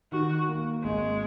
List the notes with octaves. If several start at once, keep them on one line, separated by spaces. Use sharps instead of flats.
D#3 F#4
A#3
G#1 G#3